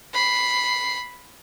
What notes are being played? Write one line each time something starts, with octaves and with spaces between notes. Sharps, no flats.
B5 C7